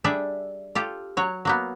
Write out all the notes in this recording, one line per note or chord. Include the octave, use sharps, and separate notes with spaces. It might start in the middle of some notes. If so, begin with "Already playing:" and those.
G3 D4 G#4 A4 E5
F4 G4 A4
F#3 C#5
F#3 A#3 B3